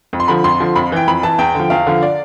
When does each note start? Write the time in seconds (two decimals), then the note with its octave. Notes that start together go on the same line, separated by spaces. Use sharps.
0.13 F2
0.20 C6
0.28 D3 F3 B5
0.44 F2 C6
0.60 D3 F3
0.76 F2 B5
0.92 E3 G5
1.07 F2 B5
1.23 E3 A5
1.38 E2 G5
1.55 D3 F3
1.70 E2 F5
1.87 D3 F3
2.03 D5